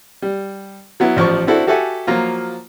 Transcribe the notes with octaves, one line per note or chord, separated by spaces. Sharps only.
G3
F#3 B3 E4
A1 F3 D5 C#6
C4 D4 E4 F#4 A4
F#4 G4 A4 E5 F#5 G#5
F3 F#3 A#3 F4